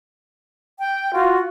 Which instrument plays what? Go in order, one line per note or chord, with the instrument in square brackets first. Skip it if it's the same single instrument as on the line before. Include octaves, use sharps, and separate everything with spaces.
[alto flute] G5
[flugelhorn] F4 [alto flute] F#4